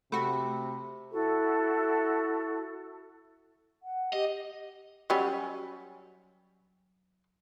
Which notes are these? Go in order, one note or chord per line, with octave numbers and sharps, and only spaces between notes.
C3 A3 F#4 B5
E4 F#4 A4
F#5
G4 D#5
F#3 G3 C#4